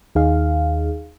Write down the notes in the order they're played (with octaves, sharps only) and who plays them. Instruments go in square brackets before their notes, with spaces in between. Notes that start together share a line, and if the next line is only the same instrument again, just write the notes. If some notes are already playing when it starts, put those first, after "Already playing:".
[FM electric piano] D#2 D#4 G#4 F5